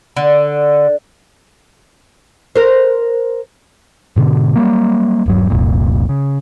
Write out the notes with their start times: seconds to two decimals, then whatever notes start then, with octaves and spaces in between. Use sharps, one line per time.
0.17 D3
2.56 A#4 C5
4.16 G#2 B2 D3
4.56 F#3 G3 A#3
5.26 D#1 G2 F#3
5.50 F1 C2 F2 A#2
6.09 C#3